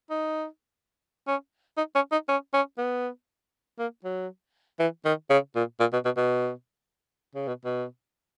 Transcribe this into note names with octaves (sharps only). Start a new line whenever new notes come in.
D#4
C#4
D#4
C#4
D#4
C#4
C#4
B3
A#3
F#3
E3
D#3
C#3
A#2
A#2
B2
B2
B2
C#3
B2
B2